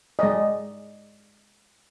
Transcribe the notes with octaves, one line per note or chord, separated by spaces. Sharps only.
G#3 D5 D#5